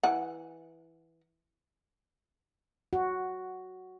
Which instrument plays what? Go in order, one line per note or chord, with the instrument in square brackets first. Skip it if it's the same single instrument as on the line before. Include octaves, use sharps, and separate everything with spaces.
[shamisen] E3 F#5
[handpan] F#4